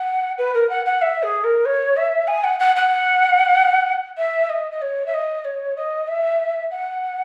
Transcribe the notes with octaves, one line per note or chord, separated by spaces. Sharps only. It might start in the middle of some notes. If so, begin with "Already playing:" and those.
Already playing: F#5
B4
A#4
F#5
F#5
E5
G#4
A#4
C#5
E5
G#5
F#5
F#5
F#5
E5
D#5
D#5
C#5
E5
D#5
C#5
D#5
E5
F#5